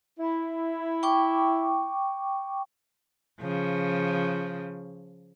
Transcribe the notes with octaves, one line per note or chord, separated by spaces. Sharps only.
E4
G5 C#6 D6
C#3 F3